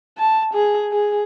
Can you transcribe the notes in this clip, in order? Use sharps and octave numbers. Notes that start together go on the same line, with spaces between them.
A5
G#4
G#4